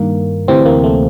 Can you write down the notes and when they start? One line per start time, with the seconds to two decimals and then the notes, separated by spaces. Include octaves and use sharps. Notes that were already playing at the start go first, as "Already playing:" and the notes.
Already playing: G2 D#3 A#3
0.48 D2 C3 E3 C4
0.65 A#3
0.84 A3